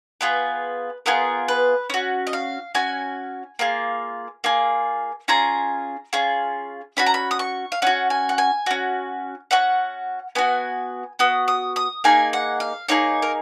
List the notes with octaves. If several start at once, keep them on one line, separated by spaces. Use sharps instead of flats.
B3 F4 G#4 B4
B3 F4 G#4 A#4
B4
C#4 F#4
D#5
F5
C#4 F#4 G#5
A#3 F4 G#4
A#3 F4 G#4
C#4 F4 G#4 A#5
C#4 F4 G#4
C#4 F#4 B5
A#5
B5
D#6
C#6
F5
C#4 F#4 F#5
G#5
F#5
G#5
C#4 F#4
C#4 F#4 F#5
B3 F#4 G#5
B3 F#4 D#6
D#6
D#6
A#3 D#4 G#4 G#5
F#5
F5
A#3 D#4 G#4 C#5
A#4